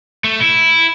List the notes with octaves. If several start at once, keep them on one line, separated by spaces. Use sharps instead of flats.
A3
E4